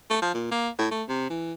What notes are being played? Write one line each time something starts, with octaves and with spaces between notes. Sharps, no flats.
A3
F3
A#2
A#3
A2
A3
C3
E3